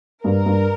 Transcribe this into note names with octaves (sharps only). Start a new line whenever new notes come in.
G2 A#4
G2